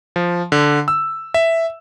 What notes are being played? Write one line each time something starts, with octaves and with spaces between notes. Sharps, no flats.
F3
D3
E6
E5